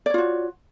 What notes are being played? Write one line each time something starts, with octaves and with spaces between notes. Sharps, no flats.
F4 F#4 C#5 D5